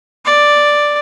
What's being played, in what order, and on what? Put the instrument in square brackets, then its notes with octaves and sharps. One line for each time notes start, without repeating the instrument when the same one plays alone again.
[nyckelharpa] D5